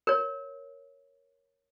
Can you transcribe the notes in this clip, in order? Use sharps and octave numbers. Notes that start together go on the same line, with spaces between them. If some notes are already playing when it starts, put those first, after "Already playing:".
A#4 C#5